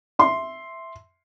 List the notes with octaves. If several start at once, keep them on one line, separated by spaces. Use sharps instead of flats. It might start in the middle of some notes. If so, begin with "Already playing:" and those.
E5 C6